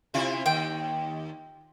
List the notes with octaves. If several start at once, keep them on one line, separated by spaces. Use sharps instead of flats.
C3 E4 F4
D#2 G5